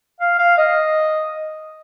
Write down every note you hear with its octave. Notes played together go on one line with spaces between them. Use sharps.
F5
F5
D#5